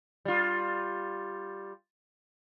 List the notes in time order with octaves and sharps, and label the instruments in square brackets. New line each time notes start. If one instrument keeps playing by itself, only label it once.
[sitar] G3 F4